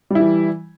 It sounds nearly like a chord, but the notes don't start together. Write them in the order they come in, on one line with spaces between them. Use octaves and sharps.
G3 E4 E3